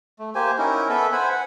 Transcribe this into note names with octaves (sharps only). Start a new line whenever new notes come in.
A3
A#3 G4 C5 G#5
C#4 D#4 E4 A#4
B3 A4 B4 E5
C5 F#5 G#5 B5
F#5